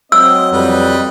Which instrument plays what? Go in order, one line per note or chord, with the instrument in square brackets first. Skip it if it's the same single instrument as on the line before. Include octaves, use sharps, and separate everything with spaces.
[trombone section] F#3 C4 [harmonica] D#5 [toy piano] E6
[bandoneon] F2 G3 [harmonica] B4 D#5 G5